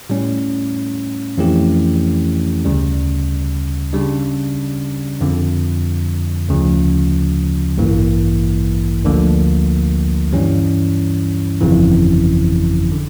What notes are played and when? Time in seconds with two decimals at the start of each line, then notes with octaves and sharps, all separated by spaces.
0.09 A2 G3 C#4
1.38 F2 E3 A3 C#4 G4
2.65 D2 C#3 G3
3.93 C#3 G3 D4
5.21 F2 D3 F3
6.49 D2 C#3 F3
7.77 A1 G2 E3 A#3
9.05 D2 D3 F3 A#3
10.33 G2 E3 G3 C#4
11.61 G1 F2 C#3 E3
12.92 D3